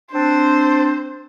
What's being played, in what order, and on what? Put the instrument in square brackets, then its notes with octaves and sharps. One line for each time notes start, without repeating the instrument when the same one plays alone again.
[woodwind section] C4 D4 [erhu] C5